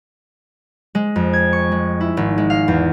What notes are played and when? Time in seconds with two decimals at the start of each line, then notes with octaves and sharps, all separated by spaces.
0.95 G#3
1.16 F2
1.33 G#6
1.53 C#6
1.72 G#3
2.01 E4
2.17 G#1
2.38 G#3
2.50 F5
2.68 E2